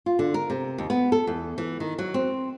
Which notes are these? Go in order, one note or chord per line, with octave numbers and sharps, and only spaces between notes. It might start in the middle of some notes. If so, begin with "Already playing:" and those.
F4
D3
A#4
C3
D#2
B3
A4
E2
E3
D#3
F#3
C4